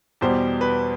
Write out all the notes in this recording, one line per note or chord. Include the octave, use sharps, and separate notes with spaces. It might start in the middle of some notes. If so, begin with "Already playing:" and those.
E2 B2 G3 C5
B4